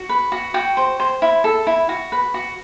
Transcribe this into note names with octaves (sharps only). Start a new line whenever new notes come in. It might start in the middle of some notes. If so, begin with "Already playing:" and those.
Already playing: F#4
B4
F#4
F#4 G5
C5
C5
E4
A4
E4
F#4
B4
F#4